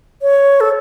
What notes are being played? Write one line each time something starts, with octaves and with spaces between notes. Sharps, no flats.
C#5
A4